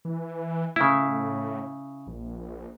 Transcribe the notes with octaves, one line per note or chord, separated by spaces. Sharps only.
E3
A2 C#3 E4
A#1